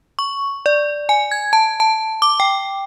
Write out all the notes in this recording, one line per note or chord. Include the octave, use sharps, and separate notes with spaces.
C#6
D5
G#5
G#6
A5
A5
D6
G5